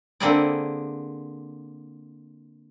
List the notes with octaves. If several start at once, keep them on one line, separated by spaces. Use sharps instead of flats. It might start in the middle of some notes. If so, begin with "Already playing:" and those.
D3 A#3 C4 E4 G#4 D5